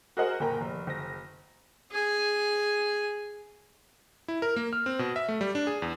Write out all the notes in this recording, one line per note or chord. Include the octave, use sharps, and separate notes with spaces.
F#4 G#4 A#4 C5 D#5 F#5
F#1 A#2 A#3 G5 G#5 A#5
F1
F#1 A#6
G#4 G#5
E4
A#4
A#3
F6
C4
B2
E5
A3
G3
D4
G#4
E2